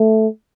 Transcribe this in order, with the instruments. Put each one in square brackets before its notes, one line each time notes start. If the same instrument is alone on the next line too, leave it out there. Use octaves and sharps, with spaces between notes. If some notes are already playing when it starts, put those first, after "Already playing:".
Already playing: [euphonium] A3